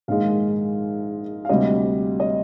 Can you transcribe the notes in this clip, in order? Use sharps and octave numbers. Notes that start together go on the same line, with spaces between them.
A#1 G#2 D#3 G#3 F5
F5
D2 C3 G3 D#5
D#5